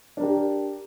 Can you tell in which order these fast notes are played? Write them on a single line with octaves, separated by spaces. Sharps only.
D4 A#4 G4